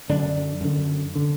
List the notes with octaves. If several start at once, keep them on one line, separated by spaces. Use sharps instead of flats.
F#2 D3 D4
F#2 D3
D3